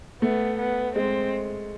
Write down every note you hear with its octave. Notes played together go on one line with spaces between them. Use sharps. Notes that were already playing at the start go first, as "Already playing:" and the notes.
A3 B3
B3
G#3 C4